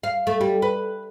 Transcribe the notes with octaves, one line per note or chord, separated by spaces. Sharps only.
F5
A3
G3
B4